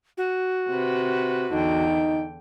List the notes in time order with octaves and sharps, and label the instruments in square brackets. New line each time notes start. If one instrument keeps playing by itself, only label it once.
[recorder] F#4
[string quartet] C3 B4
[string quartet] E2 D3 G5 [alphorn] D#4